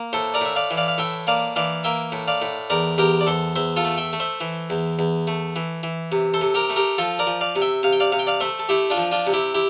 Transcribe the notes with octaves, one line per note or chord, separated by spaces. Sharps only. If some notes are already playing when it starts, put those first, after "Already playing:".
Already playing: A#3
A2 A4 C5
A#4 D5
A2 E5
D5 F5
E3
D5 F5
F5
A2 E5 G5
A#3 D5 F5
E3 D5 F5
A#3 E5 G5
A2
D5 F5
A2
E2 A#4 D5
E2 G4 A#4
D5
E2 A4 C5
E2 C5 E5
F4 A4
A3
E5 G5
A3
C5 E5
E3
E2
E2
A3
E3
E3
C3
A4 C5
C3
G4 A#4
A3
G4 A#4
F3 F4 A4
A#4 D5
F3
D5 F5
C3
E5 G5
C3 F5
G5
D5 F5
C3 F5
G5
D5 F5
A3 C5 E5
A4
A3 E4 G4
D4 F4
F3
D4 F4
C3
E4 G4
E4 G4